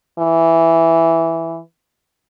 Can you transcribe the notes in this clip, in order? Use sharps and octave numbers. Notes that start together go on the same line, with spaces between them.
E3